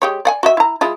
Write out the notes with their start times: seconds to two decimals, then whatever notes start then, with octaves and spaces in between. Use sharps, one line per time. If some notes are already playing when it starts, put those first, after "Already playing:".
0.02 G#3 G4 C#5
0.25 D5 F#5 G#5
0.43 F#4 D#5 E5
0.57 E4 A#5
0.81 G#3 E4 F4